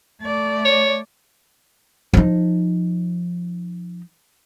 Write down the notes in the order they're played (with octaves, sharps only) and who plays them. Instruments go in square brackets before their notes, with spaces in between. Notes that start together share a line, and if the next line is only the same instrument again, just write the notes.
[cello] A3 D5
[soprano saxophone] C#5
[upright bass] F3 D#4